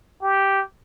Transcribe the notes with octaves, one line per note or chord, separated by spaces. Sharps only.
G4